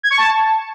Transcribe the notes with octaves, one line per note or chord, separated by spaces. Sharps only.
G#6
C#6
A5